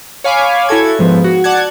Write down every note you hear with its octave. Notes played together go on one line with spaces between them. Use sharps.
C#5 F5 G#5 B5 D6
E4 F#4 A4 G#6
G#2 F3 B3
F#4
D5 F#5 A5 F#6 G#6